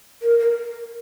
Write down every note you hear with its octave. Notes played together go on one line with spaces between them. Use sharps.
A#4
A#4